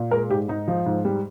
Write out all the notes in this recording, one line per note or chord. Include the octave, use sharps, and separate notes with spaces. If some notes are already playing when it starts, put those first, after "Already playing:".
Already playing: A#2
G#3 A#4
G#2 G4
G#2 D#4
F3
G#2
G3